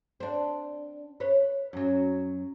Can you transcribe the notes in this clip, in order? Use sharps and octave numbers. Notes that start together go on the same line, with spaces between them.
C4 D4
B4 C#5
F#2 F#3